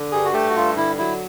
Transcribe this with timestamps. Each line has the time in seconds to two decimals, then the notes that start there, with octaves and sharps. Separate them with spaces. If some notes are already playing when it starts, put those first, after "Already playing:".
Already playing: D3
0.12 G2 G#4
0.25 F#4
0.33 A3 G4
0.49 F#4
0.55 G2 F4
0.77 D3 E4
0.98 F#3 E4